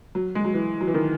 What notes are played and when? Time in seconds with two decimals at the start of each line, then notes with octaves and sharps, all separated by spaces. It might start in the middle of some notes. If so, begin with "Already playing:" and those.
0.15 F#3
0.35 G#3
0.45 F#3
0.54 E3
0.81 F#3
0.88 E3
0.94 D#3